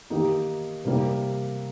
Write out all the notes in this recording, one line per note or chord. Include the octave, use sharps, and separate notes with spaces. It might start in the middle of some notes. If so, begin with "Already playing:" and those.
D#3 A#3 D#4 G4
C3 G3 A#3